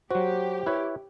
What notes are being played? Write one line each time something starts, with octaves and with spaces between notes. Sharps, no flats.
F#3 F#4 G4 C5
E4 B4 C#5